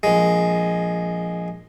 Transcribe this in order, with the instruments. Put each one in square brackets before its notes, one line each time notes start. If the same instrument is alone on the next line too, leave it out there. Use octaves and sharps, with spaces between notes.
[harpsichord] A#1 G#3